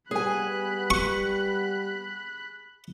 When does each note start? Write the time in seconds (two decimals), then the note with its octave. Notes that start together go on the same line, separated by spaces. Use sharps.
0.11 G3 B3 G#4 G#5 B5 F#6
0.90 C#6